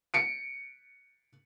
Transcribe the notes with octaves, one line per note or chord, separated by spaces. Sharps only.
C#7 D7